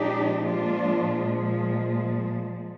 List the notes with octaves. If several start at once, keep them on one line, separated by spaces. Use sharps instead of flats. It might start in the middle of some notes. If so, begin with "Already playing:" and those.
Already playing: A#2 F3 G#3 D4 D#4 G4
D4 F4